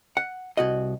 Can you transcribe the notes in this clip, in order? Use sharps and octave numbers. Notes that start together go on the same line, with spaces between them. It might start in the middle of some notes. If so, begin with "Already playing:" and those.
F#5
C2 F#4 D#5